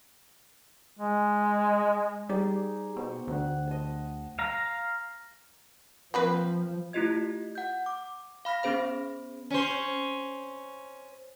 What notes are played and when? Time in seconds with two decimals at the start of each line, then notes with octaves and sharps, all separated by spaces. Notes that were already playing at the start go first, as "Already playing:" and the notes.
0.99 G#3
2.29 G3 D#4 G#4 D5
2.96 B2 C5 G5 C#6
3.27 D2 D5 F#5
3.68 D#5 A5
4.39 F5 A#5
6.14 F3 A#3 C4 B4
6.93 A3 E4 F4 G4 D#5 G#6
7.55 F#5 G6
7.86 D6
8.45 F5 B5 F6 A#6 B6
8.63 B3 C#4 G#4 C5 B5
9.50 C#4 C5